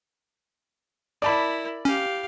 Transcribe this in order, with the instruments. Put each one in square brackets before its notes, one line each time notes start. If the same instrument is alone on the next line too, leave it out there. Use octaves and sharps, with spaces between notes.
[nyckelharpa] E4 A#4 [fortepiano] D5 A5 B5
[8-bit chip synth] C#4 [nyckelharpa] G4 F5